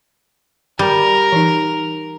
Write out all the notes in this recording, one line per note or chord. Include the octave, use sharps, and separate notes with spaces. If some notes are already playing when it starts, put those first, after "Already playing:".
G3 A#4
E3 D#4